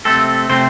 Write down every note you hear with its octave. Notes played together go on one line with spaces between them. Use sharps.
C3 A3 C4 A4
C3 A3 C4 C5